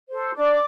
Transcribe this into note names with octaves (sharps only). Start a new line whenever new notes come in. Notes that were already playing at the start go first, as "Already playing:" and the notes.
A4 C5
D4 D5 D6